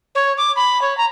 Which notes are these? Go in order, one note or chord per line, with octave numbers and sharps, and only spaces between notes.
C#5
D6
B5
C#5
A#5